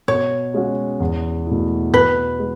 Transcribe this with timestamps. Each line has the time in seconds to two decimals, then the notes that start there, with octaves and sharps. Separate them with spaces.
0.08 B2 C#5
0.54 G#3 C#4 F#4
1.00 E2
1.47 B2 A3 E4
1.93 B2 B4
2.39 G#3